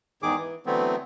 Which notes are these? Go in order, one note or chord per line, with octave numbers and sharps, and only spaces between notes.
E2 G#2 D#3 G#4 D6
E3
D3 E3 F#3 A3 B3 C4